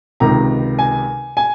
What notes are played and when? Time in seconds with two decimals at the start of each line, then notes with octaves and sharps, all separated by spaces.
0.20 C#2 C3 D#3 A#5
0.79 G#5
1.37 G#5